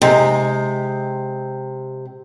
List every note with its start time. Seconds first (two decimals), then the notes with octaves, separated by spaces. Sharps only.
0.02 C3 G#3 D#4